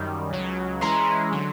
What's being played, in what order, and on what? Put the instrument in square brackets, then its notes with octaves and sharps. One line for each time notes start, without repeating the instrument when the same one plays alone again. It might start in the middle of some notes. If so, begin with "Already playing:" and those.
Already playing: [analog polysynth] F#2 D#3 G3
C#2 C#3 F#3
[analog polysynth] E3 G#3 C#4 E4 [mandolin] A#5 C6
[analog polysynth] D3 F#3